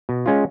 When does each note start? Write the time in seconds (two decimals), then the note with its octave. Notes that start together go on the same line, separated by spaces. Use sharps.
0.09 B2
0.26 G#3 C#4 F4